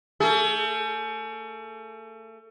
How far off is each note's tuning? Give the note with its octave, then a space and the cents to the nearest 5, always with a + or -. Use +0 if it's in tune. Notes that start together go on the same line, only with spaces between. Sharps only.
A3 +35 G#4 +45